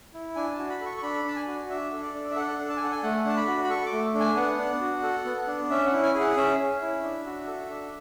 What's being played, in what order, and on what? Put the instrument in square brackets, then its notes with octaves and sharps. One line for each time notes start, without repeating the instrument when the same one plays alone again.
[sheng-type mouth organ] E4
D4 G#5
F#4 A5
B5
A4
C#6
C#6
D4 B5
D4 A5
G#5
F#4
D4 E5
A4
D5
D4
E5
A4 F#5
D4
A5
G#5
A4 F#5
G#5
A3 F#5
D4 A5
B5
F#4
B5
A4 C#6
D6
A3
D4
G#5
B3 F#5
D4
F#4
A4
B3
D4
C#4 E5
F#5
E4
G#5
G#4 F#5
C#4 E5
C#4
E4
D4
F#4
A4
D4